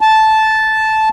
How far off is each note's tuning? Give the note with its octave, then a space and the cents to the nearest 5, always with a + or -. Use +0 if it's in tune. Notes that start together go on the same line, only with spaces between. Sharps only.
A5 -10